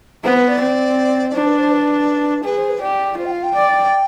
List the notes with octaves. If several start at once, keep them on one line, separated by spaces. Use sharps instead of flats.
B3 C5
B4
D5
C4
D5
D4 C5
B4
C5
B4
G#4 B4
C5
B4
G4 D5
F4 C5
G5
F5
G5
D5